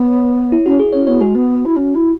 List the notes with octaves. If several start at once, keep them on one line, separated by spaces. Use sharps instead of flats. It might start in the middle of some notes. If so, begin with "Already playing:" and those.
Already playing: B3 C#5
E4
C#4 F#4
G#4
C#4 C#5
B3 C#5
G#3 F#4
B3
E4
C#4
E4